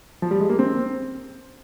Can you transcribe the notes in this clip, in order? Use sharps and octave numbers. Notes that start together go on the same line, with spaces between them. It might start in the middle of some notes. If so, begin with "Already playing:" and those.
F3
G3
G#3
A#3
C4